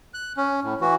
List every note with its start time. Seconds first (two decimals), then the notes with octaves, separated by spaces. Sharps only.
0.14 F#6
0.37 C#4
0.63 A2
0.81 E3 F#4